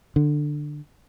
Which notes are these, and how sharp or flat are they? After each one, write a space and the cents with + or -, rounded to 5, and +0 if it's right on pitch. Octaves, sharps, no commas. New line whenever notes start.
D3 +15